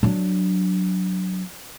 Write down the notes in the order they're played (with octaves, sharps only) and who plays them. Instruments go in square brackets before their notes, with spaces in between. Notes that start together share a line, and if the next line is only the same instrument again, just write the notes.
[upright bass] F#3 D4